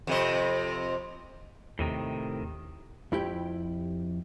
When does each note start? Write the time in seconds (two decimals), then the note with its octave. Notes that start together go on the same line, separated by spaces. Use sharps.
0.07 F2 C3 D#5
1.79 D#2 A2 C3 D#3
3.12 F2 E4 G4 G5